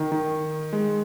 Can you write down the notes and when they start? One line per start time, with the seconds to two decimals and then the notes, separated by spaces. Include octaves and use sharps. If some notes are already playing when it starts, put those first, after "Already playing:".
Already playing: D#3
0.12 D#3
0.73 G#3